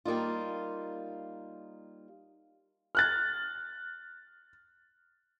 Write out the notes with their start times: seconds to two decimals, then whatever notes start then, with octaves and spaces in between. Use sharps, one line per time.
0.05 G3 A#3 D#4 F4
2.95 F6 F#6 A6